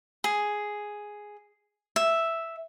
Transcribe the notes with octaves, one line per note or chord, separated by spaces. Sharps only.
G#4
E5